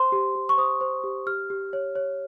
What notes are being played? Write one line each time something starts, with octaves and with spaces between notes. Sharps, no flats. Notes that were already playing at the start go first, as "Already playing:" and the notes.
Already playing: C5 C6
G4
G4
C#6
C5 D#6
C5
G4
G4 F6
G4
C#5
C#5